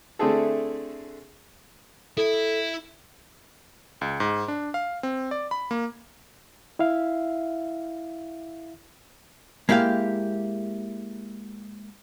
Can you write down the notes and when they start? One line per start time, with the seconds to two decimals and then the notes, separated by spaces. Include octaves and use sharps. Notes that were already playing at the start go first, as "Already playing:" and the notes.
0.19 D3 A3 C4 E4 G#4 A4
2.17 E4 A4
4.01 C#2
4.20 G#2
4.48 D4
4.74 F5
5.03 C4
5.31 D5
5.51 B5
5.71 A#3
6.79 E4 E5 F5
9.69 G#3 A#3 E4 G4 F5